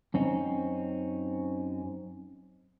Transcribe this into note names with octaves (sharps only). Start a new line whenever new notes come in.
F#2 C4 C#4 D#4